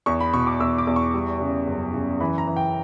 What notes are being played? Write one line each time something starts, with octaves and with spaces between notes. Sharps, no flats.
E2 C#6
B5
B2 C#6
D6
E2 E6
D6
E2
C#6
G3
C#3
F#2
C#3
E3 B5
A#5
E3
G5